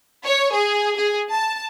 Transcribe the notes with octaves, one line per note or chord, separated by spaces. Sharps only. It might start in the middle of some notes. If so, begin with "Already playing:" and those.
C#5
G#4
G#4
A5